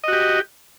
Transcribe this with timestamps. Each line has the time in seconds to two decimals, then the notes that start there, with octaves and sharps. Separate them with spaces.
0.04 D#5
0.08 F#4
0.13 G4